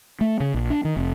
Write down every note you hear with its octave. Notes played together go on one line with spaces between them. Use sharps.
A3
C#3
A#1
D4
D#3
F1